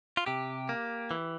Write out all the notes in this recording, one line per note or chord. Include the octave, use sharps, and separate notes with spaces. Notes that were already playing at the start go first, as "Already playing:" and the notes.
F4
C3 G4
A#3
E3